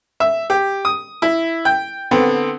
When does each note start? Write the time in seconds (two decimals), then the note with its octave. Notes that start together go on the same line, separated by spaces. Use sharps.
0.20 E5
0.50 G4
0.85 D#6
1.22 E4
1.65 G5
2.11 D3 B3 C4